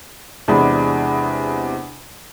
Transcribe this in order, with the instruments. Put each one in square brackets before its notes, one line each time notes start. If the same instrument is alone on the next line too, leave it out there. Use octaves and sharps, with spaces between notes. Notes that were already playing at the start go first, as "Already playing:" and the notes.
[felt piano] E2 C3 G#3 D4 B5